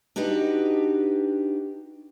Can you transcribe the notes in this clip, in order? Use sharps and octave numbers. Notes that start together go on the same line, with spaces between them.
D4 D#4 F#4 G4 B4